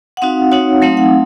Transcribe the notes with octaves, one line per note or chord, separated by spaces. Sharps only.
F#5
C4 D#4 F#4 F5
C4 D#4 F#4 C#5
F#3 A3 C4 D#4 F5
F#5